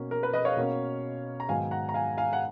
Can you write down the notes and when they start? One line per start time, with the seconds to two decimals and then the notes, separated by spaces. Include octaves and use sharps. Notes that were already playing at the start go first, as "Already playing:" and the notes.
Already playing: B2 A#3 C#4
0.11 A#4
0.23 B4
0.33 B4 D#5
0.45 C#5 F5
0.57 B2 A#3 C#4
1.40 A#5
1.49 G#2 D#3 F#3 B3 F5 G#5
1.71 F#5 A#5
1.89 A#5
1.94 F5 G#5
2.18 F5 G#5
2.33 F#5